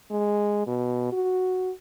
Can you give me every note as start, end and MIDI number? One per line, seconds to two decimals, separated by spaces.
0.10 0.66 56
0.66 1.11 47
1.12 1.71 66